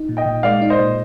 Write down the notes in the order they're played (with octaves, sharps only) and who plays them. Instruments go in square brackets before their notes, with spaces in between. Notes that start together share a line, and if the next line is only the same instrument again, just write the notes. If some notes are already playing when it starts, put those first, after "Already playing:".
Already playing: [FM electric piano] D#4
A#2
[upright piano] D#5 G5
[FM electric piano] A#2
[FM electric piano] G#3 [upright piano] D5 F5
[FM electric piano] D#4
[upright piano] C5 D#5
[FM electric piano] A#2